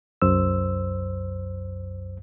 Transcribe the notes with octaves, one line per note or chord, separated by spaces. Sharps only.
C2 F#2 C5 E6